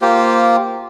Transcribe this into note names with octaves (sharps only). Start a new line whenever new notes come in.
A#3 F4 G4 C5